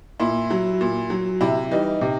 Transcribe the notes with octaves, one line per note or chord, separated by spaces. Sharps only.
A#2 E4
F#3
A#2
F#3
C3 E4
E3 G3 D#4
C3